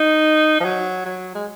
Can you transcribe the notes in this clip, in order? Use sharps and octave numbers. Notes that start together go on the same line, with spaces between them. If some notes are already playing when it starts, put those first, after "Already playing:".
Already playing: D#4
F3
F#3
F#3
G#3